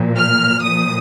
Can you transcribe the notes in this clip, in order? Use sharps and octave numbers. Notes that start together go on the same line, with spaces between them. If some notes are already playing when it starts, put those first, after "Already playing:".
Already playing: A#2 F3
F6
A#2 F3 D#6